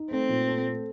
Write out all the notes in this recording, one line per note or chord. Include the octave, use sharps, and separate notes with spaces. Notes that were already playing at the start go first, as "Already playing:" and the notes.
Already playing: D#4
A3 C4
A#2
A4
A3